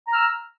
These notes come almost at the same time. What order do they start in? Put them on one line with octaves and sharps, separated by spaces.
A#5 F6 E6